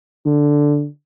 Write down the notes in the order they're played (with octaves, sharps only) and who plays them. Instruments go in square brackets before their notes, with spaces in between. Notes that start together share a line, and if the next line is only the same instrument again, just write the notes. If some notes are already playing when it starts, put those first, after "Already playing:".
[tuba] D3